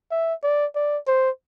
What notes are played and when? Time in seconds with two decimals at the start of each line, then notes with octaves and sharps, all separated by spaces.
0.11 E5
0.43 D5
0.75 D5
1.07 C5